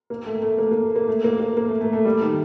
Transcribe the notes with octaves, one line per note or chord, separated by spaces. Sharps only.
A#3
A3
A3
A#3
A#3
A#3
A3
A#3
A#3
A#3
A3
A3
A3
G3
D#3